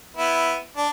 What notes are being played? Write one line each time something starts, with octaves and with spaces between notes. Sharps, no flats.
B3 E4
D4